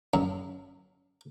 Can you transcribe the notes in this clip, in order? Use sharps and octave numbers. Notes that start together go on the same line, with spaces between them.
F#2